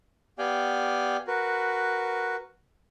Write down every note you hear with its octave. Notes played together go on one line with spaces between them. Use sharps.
B3 G4 D5 F5 G5 G#5
F#4 A#4 B4